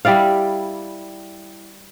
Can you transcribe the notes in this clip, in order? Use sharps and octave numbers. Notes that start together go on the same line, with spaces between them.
G3 E4 D5 F5